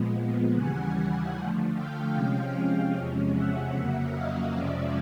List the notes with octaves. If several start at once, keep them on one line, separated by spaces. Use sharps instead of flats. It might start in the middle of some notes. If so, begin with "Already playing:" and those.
Already playing: A#2 F3 G#3 B3
D#2 C#3 E3 G3 F#5 G#5
D3 F3 A3
F5 G5
C3 F3 G#3 C#4
E2 C3 F3 G#3 C#4
E5 F#5
F2 C#3 F#3 A#3
D#5 F5
F2 C3 F3 G#3 C#4 D5 E5